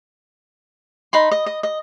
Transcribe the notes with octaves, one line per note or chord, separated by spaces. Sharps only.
D#4 B5 C6
D#5
D#5
D#5